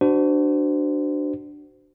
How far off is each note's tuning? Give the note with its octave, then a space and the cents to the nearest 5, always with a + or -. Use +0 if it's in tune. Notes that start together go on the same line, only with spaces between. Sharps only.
D4 +10 F#4 +20 C5 -30